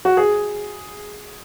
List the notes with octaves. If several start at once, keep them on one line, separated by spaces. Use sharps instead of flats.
F#4
G#4